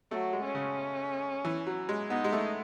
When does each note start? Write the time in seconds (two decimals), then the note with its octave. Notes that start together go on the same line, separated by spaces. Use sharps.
0.11 F#3 A3
0.33 G#3
0.44 C#4
0.55 C#3
1.45 E3
1.67 F#3
1.89 G#3
2.10 B3 D#4
2.24 G#3
2.33 A3